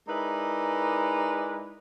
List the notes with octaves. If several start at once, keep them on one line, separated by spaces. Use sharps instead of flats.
G#3 D#4 E4 A#4 B4 D5